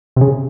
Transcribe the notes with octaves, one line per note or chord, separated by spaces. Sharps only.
C3
C#3